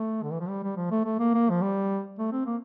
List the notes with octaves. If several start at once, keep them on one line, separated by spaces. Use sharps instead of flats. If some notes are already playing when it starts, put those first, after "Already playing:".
Already playing: A3
D3
E3
F3
G3
G3
F3
A3
A3
A#3
A#3
F3
G3
A3
C4
A#3